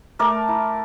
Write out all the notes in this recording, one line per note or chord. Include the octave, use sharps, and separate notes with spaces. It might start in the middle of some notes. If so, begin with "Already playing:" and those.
A3 A#4 D5
E4